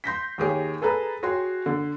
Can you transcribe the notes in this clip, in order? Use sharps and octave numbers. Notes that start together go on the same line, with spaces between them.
C6 G6 A#6 B6
D#2 G4 G#4 C#5
G#4 A4 B4 A#5
F#4 G#4 C#5 G5 C6
D3